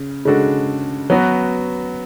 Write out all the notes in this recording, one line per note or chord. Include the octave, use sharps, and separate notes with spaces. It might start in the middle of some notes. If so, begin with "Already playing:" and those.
Already playing: C#3
C#3 G#3 D4 F#4 A4
F#3 B3 F#4 B4